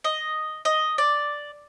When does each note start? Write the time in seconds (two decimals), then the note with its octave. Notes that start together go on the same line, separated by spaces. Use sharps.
0.04 D#5
0.65 D#5
0.98 D5